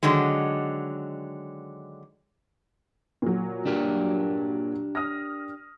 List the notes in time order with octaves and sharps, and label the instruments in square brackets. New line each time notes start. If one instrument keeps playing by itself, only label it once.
[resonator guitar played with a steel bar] D3 D#3 F#3 G#3
[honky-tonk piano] A#2 F#3
[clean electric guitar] D4 G4 A#4
[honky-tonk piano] D#6 F6 A#6